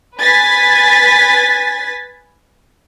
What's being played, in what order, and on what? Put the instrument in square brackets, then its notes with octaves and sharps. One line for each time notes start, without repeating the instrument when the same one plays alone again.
[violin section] B4 G#5 A6 B6